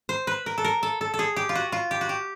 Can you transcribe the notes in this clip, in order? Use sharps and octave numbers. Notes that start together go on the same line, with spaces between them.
C5
B4
A#4
A4
A#4
A4
A4
A4
G#4
G4
F4
F#4
F4
G4
F#4
G4